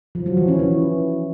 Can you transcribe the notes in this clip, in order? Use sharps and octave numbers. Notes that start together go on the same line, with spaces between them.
F3
F#3
E3
C#4
E3